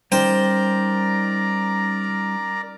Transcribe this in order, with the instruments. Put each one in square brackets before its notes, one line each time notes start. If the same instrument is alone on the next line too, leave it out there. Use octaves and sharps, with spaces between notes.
[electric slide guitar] G3 C#4 D#4 [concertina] A#4 D5 A#5 [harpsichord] C5 G5